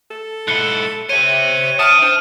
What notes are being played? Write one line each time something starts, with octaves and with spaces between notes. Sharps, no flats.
A4
G#2 E4 F#6 C#7 G7
C5 C#5 E5 D#7
E5 G5 A5 D#6 F6 D#7
D4 C5 A5